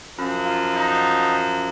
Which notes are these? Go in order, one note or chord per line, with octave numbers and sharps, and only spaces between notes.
F#2 F3
F4
D#4